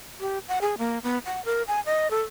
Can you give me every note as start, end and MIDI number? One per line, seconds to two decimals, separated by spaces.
0.20 0.39 67
0.48 0.59 78
0.61 0.75 68
0.78 0.98 58
1.03 1.18 59
1.26 1.43 78
1.45 1.62 70
1.68 1.80 80
1.86 2.10 75
2.11 2.22 69